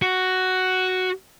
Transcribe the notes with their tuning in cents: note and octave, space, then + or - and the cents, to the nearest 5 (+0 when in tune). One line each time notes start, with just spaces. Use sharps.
F#4 +5